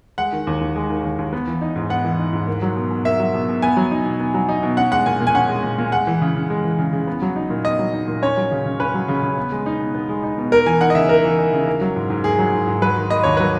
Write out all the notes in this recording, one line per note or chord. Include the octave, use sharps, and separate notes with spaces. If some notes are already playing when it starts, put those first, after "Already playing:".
G#3 F#5
D#3
D#2
D#2
G#3
D#3
D#2
D#2
B3
E3
D#4
G#2
B3 F#5
E3
D#4
G#2
A#3
F#3
B2
B2
A#3 E5
F#3
B2
B2
B3 G#5
F#3
D#4
B2
B3
F#3
D#4
B2
C#4 F#5
G#3 F#5
A#2 G#5
A#2
G#5
C#4 F#5
G#3
A#2
A#2
G#3 F#5
E3
C#3
C#3
G#3
E3
C#3
C#3
B3
F#3
D#4
A#2
B3 D#5
F#3
D#4
A#2
C#4 C#5
F#3
C#3
C#3
C#4 B4
F#3
C#3
C#3
B3
G#3
D#4
B2
B3
G#3
D#4
B2
A#3 A#4
E3 G#5
D#4 F#5
D#5
C#3 E5
A#3 A#4
E3
D#4
C#3
A#3
F#3
G#2
G#2
A#3 G#4
F#3
G#2
G#2
F#3 B4
D#3
A#3 D#5
D#2 C#5
F#3 B4